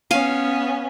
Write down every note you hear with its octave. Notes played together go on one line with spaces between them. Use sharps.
B3 C#4 F5 G#5